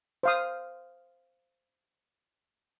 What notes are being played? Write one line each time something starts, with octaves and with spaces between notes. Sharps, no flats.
C5 F5 D#6